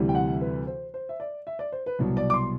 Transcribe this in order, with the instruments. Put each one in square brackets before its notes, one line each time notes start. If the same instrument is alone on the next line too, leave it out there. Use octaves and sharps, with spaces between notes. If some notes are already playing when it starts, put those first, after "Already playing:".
Already playing: [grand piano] D2 C3 E3 G3
G5
F#5
B4
C5
C5
E5
D5
E5
D5
C5
B4
C2 B2 F#3
D5
D6
C6